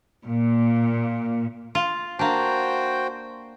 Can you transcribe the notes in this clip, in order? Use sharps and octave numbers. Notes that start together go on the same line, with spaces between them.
A#2
F4
A#3 D4 F#4 C5 G5